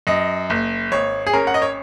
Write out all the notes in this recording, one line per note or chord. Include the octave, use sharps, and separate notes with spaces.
F#2 D#5
F#1
G#1 C#5
G#4
C#4 A#4
F#5
D#5
C#5